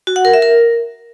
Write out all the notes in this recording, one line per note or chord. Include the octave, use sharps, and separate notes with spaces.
F#4
F#5
A#4
E5
A#4